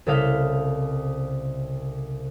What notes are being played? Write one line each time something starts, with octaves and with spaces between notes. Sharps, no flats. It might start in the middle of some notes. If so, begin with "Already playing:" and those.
C2 C#3 A4 D#5 F5 B6